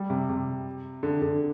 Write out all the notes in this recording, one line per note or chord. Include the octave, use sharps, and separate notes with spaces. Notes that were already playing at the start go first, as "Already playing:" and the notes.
Already playing: G3
C3
C3
D3
D3